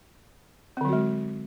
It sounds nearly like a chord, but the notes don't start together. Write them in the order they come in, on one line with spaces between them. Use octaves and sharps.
C4 D3 F#3 F#4 G#3